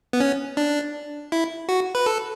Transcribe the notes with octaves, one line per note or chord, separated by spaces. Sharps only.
B3
C#4
D4
E4
F#4
B4
A4